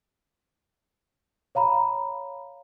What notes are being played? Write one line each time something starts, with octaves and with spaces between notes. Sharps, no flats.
C#5 F5 A#5 B5